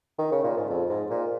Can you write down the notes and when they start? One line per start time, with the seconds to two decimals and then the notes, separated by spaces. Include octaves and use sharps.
0.19 D#3
0.32 C#3
0.44 A#2
0.57 G#2
0.69 F2
0.90 G#2
1.10 A#2